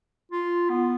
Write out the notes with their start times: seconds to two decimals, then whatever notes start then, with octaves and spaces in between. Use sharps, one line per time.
0.32 F4
0.70 B3